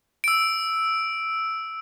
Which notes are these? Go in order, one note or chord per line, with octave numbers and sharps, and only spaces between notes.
E6 D7